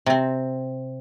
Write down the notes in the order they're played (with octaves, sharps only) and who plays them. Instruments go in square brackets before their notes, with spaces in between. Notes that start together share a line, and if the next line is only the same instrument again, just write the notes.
[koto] C3 C4